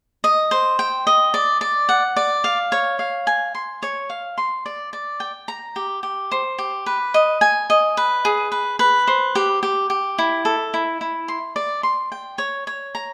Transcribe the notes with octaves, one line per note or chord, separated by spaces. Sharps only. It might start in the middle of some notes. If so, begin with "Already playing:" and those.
D#5
C5
G5
D#5
D5
D5
F#5
D5
F5
C#5
F5
G#5
C6
C#5
F5
C6
D5
D5
G5
A#5
G4
G4
C5
G4
B4
D#5
G#5
D#5
B4
G#4
B4
B4
C5
G4
G4
G4
E4
A4
E4
E4
C6
D5
C6
G5
C#5
C#5
A#5